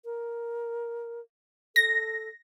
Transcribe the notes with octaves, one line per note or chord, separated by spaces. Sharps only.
A#4
A4 A#6